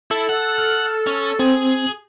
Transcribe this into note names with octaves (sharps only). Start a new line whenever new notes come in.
E4 A4
F#5
F6
C#4
C4 G#4